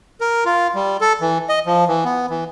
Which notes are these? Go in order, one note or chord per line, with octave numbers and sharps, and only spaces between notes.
A#4
F4
G3
A4
E3
D#5
F3
E3
B3
E3